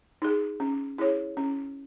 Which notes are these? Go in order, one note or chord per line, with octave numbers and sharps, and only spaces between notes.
D#4 G#4
C#4
E4 G#4 C#5
C#4